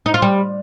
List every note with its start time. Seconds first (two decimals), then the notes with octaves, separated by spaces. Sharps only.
0.06 D#4
0.14 F4
0.22 G3